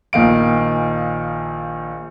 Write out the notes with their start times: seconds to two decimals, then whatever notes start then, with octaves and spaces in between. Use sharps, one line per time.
0.13 A#1 A#2 D#3 F5 D7